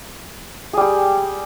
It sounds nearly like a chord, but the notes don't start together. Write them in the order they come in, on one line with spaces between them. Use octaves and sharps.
G#4 G3 G4